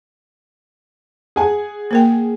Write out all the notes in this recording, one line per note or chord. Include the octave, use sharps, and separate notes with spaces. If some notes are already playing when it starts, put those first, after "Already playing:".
G#4 F#5 G#5
A#3 A#4 G5